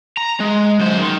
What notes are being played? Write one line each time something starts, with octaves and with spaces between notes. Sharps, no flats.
A#5
G#3
F#2 C5
D#3